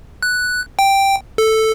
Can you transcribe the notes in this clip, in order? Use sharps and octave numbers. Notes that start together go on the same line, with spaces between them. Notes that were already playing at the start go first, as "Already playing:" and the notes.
F#6
G5
A4